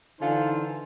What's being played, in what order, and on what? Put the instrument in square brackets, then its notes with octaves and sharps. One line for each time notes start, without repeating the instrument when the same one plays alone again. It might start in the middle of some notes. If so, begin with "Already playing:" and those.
[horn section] D3 E3 D#4 F4 C5 G#5